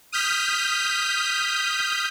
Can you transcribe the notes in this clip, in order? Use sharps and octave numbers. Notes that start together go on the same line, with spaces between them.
D#6 F6 G6 B6